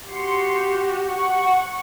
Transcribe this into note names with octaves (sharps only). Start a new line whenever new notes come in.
F#4 G4 C6 C#7
F#5 C#6